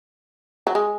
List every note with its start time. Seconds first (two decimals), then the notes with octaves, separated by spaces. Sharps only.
0.67 F#3
0.75 G#3